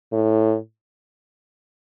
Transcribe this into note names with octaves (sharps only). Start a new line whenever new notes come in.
A2